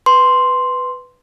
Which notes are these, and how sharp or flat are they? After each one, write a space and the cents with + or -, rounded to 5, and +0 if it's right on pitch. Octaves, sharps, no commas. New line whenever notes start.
B4 +5 C6 +0